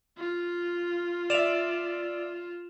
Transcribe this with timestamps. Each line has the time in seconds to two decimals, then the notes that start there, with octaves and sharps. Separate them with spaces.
0.18 F4
1.30 D5 E5 E7 F7